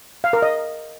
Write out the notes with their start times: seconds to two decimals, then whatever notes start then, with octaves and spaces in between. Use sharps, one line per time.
0.24 F5
0.33 A#4
0.42 D#5